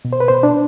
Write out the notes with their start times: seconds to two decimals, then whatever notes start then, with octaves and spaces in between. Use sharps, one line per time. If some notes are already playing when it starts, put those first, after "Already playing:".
0.05 B2
0.13 C5
0.20 B4
0.28 B2 C5
0.43 D4